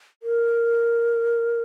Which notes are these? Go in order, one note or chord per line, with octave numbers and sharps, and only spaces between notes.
A#4